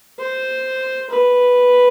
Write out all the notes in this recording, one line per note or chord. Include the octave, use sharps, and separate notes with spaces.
C5
B4